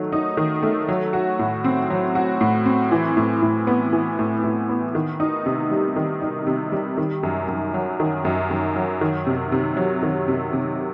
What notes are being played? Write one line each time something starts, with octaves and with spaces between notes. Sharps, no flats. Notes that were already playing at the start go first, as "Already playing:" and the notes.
Already playing: D#3 F#3 A3
D#4
D#3
A3
F#3
F#4
A2
C4
F#3
F#4
A2
C4
E3
A2
A2
B3
E3
A2
A2
B3
D#3
D#4
C3
G3
D#3
D#4
C3
G3
D#3
F#2
F#2
F#3
D#3
F#2
F#2
F#3
D#3
C3
C3
F#3
D#3
C3
C3